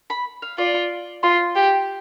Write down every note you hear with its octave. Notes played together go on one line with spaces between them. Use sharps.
B5
F5
F4 D5
F4 C6
G4